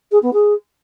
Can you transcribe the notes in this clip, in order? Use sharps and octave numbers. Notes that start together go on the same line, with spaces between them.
G#4
B3
G#4